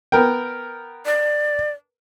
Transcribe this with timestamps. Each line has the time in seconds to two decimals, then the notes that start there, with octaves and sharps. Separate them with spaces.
0.12 B3 A#4 G5
1.06 D5